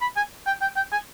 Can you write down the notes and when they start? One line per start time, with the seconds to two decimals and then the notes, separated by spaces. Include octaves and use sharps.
0.01 B5
0.16 G#5
0.47 G5
0.61 G5
0.76 G5
0.92 G#5